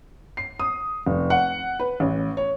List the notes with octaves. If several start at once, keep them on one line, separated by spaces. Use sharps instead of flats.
C7
D#6
F1
F#5
B4
A1
C#5